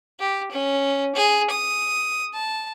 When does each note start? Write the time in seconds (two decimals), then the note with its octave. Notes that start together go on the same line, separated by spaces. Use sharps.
0.19 G4
0.51 C#4
1.15 G#4
1.50 D#6
2.34 A5